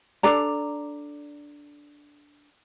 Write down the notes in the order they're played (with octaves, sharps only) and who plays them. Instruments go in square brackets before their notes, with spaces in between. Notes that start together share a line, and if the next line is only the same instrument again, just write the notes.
[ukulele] D4 A4 D5 A#5